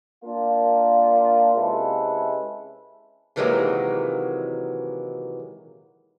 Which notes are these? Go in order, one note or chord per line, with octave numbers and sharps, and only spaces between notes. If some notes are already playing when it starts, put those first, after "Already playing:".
A#3 D4 F4
C3 G#3 C#4 E4 A4 B4
C3 D#3 E3 F#3 G#3 A#3